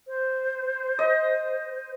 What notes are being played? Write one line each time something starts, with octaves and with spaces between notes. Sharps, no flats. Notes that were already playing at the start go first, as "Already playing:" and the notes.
C5
D#5